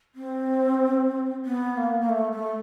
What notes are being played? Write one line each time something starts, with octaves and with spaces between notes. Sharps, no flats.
C4
B3
A#3
A#3
A3
A3